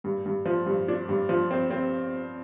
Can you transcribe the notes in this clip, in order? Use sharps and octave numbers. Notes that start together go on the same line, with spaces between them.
G2
G2
F3
G2
D4
G2
F3
C4
C4